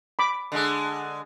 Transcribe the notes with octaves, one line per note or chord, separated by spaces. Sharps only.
B5 D6
D3 G#3